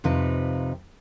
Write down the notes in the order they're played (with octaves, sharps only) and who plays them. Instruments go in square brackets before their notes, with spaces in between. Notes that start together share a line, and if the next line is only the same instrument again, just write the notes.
[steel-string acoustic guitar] F2 C3 F3 D#4 B4